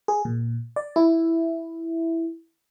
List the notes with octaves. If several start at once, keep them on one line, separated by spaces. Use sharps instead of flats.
G#4
A#2
D5
E4